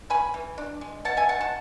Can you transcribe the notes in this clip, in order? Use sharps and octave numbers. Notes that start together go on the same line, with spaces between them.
E3 G#5 B5
E3
D4
G#3
B2 F#5 A5
E5 G#5
B2 F#5 A5
F#5 A5